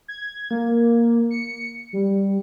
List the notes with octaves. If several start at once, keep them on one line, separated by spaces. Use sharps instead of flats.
G#6
A#3
C#7
G3